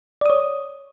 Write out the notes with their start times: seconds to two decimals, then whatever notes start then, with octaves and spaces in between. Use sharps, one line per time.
0.21 D5
0.26 D#6
0.30 C#5